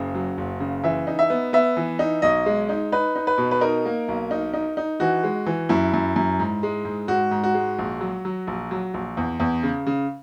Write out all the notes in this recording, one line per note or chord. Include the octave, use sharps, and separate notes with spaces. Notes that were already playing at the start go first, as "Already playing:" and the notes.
Already playing: F#1 C#3
F#3
F#1
C#3
E3 E5
D#4
E5
B3
B3 E5
E3
D#4
B1 D#5
G#3
D#4
D#4 B4
D#4
B4
B2
B4
D#4 A#4
A#3
B1
D#4
D#4
D#4
E3 F#4
G#3
E3
F#2 E4
F#2
F#2
G#2
G#3
G#2
G#2 F#4
G#2
F#4
G#3
A#1
F#3
F#3
A#1
F#3
A#1
E2
E2
C#3
C#3